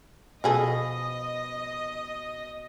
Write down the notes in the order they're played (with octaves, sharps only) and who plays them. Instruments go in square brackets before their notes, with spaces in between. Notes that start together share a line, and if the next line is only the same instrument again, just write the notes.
[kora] B2 [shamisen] F3 G#4 A4 [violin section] D#5